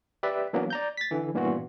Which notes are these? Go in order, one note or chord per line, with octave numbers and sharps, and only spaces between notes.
G4 B4 D5 E5
E3 F#3 A#3 B3 D4
D5 A#5 G6
A6 B6
D3 E3
G2 A#2 E3 B3 F4 F#4